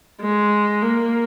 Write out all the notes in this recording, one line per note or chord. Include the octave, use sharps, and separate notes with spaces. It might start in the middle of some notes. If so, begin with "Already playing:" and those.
G#3
A#3